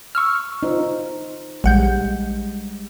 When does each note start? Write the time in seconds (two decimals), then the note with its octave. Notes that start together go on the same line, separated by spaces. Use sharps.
0.15 C#6 E6 F6
0.63 D#4 F4 C5
1.64 A#1 G3 G#3 F#5 G6